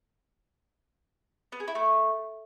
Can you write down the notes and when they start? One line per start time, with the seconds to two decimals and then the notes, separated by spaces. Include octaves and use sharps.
1.52 B3
1.60 G#4
1.68 E4
1.75 A3